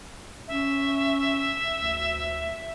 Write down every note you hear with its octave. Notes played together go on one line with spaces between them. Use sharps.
C#4 E5
D2